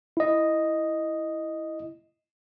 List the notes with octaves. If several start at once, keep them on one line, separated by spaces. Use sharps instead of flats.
E4 D#5